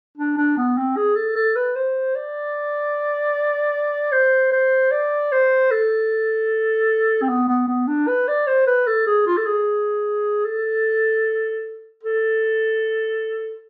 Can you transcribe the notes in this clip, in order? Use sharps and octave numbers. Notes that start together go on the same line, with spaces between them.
D4
D4
B3
C4
G#4
A4
A4
B4
C5
D5
C5
C5
D5
C5
A4
C4
B3
B3
B3
D4
B4
D5
C5
B4
A4
G#4
F4
A4
G#4
A4
A4